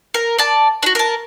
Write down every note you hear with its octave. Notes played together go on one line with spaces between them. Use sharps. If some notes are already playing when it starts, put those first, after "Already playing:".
A#4
D5 A5
D4 F#4
A#4 A5